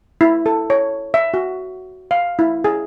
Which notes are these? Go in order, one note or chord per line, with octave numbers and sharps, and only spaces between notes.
E4
A4
C#5
E5
F#4
F5
E4
G#4